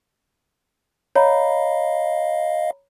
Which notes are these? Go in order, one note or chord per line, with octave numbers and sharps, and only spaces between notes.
C#5 D#5 F5 A#5 B5